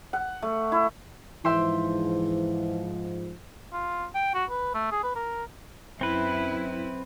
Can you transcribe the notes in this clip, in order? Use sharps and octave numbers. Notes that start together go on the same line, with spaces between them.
F#5
A3
E4
G#2 E3 F3 E5 G5 C6
F4
G5
F#4
B4
A3
G#4
B4
A#4
F#2 C4 E4 B4